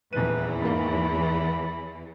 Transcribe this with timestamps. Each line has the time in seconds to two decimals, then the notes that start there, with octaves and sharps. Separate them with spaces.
0.13 D#1 E2 E3 B4 D#7
0.62 G#2 A#3 B5